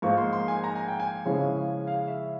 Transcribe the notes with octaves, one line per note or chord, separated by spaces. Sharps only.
G#2 F3 A#3 F4 C#6
C6
C6
G#5
A#5
G#5
G5
G#5
C#3 F3 G#3 C#4 E4
F5
E5